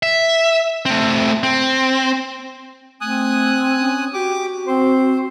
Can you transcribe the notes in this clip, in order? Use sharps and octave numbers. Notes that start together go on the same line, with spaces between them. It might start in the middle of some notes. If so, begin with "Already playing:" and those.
E5
A3 C4
C4
A3 C4 G#5 D#6 F#6
C#4
F#4 G4 D6
C4 C5